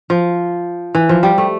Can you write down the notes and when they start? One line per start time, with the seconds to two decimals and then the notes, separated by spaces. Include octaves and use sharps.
0.10 F3
0.95 E3
1.09 F3
1.23 G3
1.38 A3